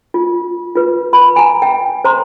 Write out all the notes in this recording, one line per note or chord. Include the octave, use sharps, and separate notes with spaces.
F4
F4 B4
B5
G#5 A#5
G5
C5 A#5 C6